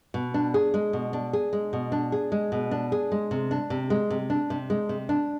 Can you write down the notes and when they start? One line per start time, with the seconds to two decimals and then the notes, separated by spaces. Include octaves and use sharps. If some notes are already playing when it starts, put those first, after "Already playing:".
0.14 B2
0.34 D4
0.54 G#4
0.74 G#3
0.93 B2
1.13 D4
1.33 G#4
1.53 G#3
1.73 B2
1.92 D4
2.12 G#4
2.32 G#3
2.52 B2
2.71 D4
2.92 G#4
3.12 G#3
3.31 C3
3.51 D4
3.70 C3
3.90 G#3
4.10 C3
4.30 D4
4.50 C3
4.70 G#3
4.89 C3
5.09 D4